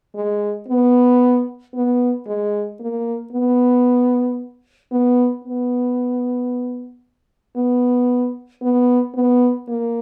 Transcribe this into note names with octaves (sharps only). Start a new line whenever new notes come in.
G#3
B3
B3
G#3
A#3
B3
B3
B3
B3
B3
B3
A#3